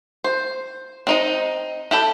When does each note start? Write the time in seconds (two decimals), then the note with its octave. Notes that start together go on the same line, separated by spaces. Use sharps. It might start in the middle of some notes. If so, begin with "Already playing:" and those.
0.24 C5
1.07 C4 D#4 D#5
1.91 E4 G4 A4